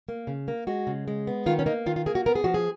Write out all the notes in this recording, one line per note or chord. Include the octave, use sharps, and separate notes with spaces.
A#3
C#3
A#3
G#3 F#4
C#3
G#3
B3
D#3 F4
C#4
A#3 D#4
D#3 F4
F4
A#3 G#4
F#4
B3 A#4
G#4
F3 F#4
G#4